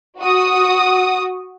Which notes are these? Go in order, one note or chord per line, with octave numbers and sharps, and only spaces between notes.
F#4 D#6